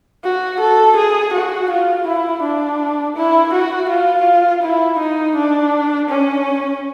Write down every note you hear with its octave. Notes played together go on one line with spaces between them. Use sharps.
F#4
A4
G#4
F#4
F4
E4
D4
E4
F#4
F4
E4
D#4
D4
C#4